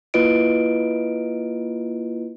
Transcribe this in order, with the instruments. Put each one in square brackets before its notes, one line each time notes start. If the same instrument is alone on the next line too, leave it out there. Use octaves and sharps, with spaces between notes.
[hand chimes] A#3 E4 F4 B4 D#5 D7